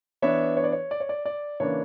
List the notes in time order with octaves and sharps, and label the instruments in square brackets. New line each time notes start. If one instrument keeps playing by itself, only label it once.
[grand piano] E3 B3 D4 C#5 E5
C#5
D5
C#5
D5
C#5
D5
D5
C#3 E3 A#3 D4 C#5